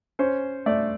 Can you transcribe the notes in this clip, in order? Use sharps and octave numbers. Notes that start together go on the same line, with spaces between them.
C#4 C5
A3 D5